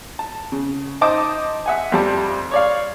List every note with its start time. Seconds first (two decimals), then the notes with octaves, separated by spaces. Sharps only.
0.19 A5
0.52 C#3
1.01 D#4 C5 D#5 A5 D6 D#6
1.66 E5 F#5 G#5
1.92 F2 G3 A5
2.51 C#5 D5 F5